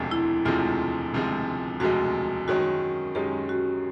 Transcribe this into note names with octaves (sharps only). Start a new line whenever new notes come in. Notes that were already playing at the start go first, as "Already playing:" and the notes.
Already playing: E1 D2 C3 F3 G#3
E4
E1 D2 C3 F3 G#3 F4
E1 D2 C3 F3 G#3
E1 D2 C3 F3 G#3 F#4
F#2 D#3 G#3 C#4 F#4
F#2 D#3 G#3 C#4 G4
F#4